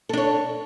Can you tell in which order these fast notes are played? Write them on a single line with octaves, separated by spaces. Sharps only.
A4 D4 C#5